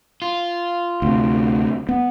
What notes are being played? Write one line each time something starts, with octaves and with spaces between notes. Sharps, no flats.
F4
D2 C3
B3